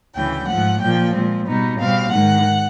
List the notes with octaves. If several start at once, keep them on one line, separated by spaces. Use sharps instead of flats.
D2 C#3 E3 G5
G#2 F3 A3 F#5
A#2 F3 A#3 G5
A#2 F3 G#3 C4
B2 G3 B3 D#4
B2 G3 C4 F5
G#2 D#3 G#3 F#5